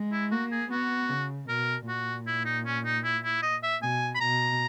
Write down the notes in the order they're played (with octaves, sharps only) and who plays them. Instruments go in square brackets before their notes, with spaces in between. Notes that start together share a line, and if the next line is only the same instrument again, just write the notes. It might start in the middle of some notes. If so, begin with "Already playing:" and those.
Already playing: [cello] G#3
[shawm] E4
[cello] A#3 [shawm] F#4
[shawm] G#4
[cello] B3 [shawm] F#4
[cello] C#3
[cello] B2 [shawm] A#4
[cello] A#2 [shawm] F#4
[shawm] E4
D#4
C#4
D#4
E4
E4
D#5
E5
[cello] B2 [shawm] G#5
[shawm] B5
[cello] B2 [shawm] A#5